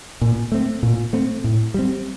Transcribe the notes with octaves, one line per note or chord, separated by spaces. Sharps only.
A#2
A3 C4
A#2
A3 C4
A2
G3 C4